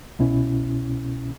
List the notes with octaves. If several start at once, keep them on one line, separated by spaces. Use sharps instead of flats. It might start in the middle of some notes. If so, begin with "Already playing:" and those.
C2 B2 C#4 E4